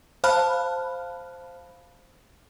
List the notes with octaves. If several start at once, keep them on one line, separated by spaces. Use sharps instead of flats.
C5 F5 A5 B5 F6 F#6